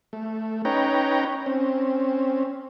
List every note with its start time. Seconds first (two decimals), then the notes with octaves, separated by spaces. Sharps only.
0.13 A3
0.65 C#4 D#4 B4 C#5 G5 A#5
1.46 C4 C#4